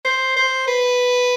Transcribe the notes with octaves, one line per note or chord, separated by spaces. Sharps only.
C5
C5
B4